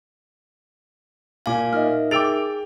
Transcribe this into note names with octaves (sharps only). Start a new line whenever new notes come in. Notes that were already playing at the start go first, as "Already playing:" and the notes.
A#2 F5 G#5 D6
D#4 A#4 D#5 E5 F6
G#4 G5 D6 E6 A6 D7 F7